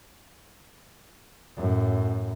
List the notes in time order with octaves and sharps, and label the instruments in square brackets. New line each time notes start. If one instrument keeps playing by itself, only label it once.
[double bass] F#2 A2